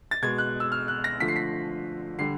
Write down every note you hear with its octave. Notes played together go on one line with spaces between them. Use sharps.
A6
B2 G#3 G#6
F#6
E6
F6
F#6
A#6
D3 F3 A3 B6
C7
B6
D3 G3 C7